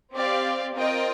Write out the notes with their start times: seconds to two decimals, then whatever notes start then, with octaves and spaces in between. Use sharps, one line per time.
0.14 C4 G4 D5 F5
0.75 C4 F4 A#4 D#5 G5